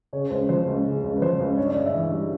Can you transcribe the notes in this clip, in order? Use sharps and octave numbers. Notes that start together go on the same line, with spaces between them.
C#3 C#5
C#2 C5
F3 C5
C#2
C#3
C#2
B4
F3 C5
C#2
G2 C#5
D5
G1 D#5
E5
E3
G3